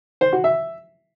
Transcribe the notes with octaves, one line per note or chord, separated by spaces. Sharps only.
C5
F#4
E5